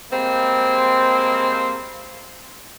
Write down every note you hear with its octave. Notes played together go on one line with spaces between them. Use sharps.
G3 G#3 A#3 C4